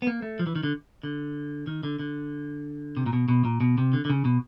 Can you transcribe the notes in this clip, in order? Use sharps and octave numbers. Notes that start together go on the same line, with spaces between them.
B3
A#3
A3
F3
E3
D#3
D3
D3
D#3
D3
D3
C3
A#2
B2
B2
A#2
B2
C3
D3
D3
C#3
B2